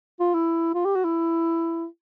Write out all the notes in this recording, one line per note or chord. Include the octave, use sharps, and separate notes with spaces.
F4
E4
F4
G4
F#4
E4